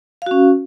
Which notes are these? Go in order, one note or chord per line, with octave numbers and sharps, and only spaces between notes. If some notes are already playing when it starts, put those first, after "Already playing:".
C#4 F#4 F5